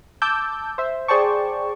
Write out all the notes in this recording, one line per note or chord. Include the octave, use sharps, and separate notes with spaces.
A5 D6 E6 G6
C5 E5
G#4 C5 D5 G5 A5 C#6